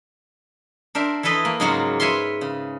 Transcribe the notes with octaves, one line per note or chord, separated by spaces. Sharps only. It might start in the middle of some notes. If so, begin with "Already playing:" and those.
D4 A#4 C5 E5
E3 E4 A4 B4 D#5 C6
A#3
G#2 C#3 F#3 A#3 F4 F#4
B4 C#5 E5 F5 B5 C6
C#3